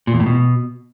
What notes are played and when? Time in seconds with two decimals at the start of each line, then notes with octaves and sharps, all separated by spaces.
0.07 A#2
0.14 E2
0.20 A2
0.26 B2